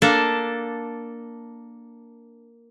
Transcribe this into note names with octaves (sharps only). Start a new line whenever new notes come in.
A#3 D4 A4